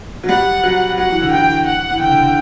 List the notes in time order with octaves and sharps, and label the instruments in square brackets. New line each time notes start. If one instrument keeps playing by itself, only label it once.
[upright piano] F#3
[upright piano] G3 [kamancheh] F#5
[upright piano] F#3
[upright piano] F#3 [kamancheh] F#5
[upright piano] E3
D3
[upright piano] E3 [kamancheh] G5
[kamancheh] F#5
[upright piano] E3
[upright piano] D3 [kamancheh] G5
[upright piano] D3
D3